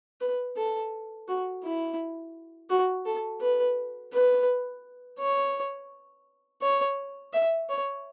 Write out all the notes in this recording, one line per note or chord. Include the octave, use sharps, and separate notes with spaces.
B4
A4
F#4
E4
F#4
A4
B4
B4
C#5
C#5
E5
C#5